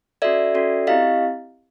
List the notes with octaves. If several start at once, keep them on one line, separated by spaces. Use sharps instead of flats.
C#4 F#4 A4 D5 E5
C#4 F#4 A4
C4 E4 G4 D#5 F5